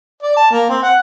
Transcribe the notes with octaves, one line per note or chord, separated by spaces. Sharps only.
D5
A5
A#3
C4
F#5